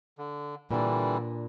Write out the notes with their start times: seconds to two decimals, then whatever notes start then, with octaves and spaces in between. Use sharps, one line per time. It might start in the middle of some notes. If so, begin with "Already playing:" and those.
0.18 D3
0.71 A#2 D3 E3 G3 D4